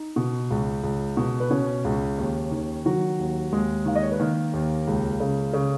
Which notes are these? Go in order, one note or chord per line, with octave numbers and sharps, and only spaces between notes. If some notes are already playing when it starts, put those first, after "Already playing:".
Already playing: D#4
B2
C#2
C#2
B2
B4
B2 C#4 C#5
C#2
D#2
D#3
D#3 F#3 F#4
D#2
D#2 G#3 G#4
D#3 F5
D#5
C#5
B4
D#3 A#3 A#4
D#2
C#2
C#3
C#3